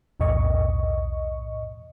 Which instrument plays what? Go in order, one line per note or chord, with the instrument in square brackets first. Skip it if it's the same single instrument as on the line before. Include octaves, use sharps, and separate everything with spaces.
[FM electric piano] B1 E2 A2 D#5 C#6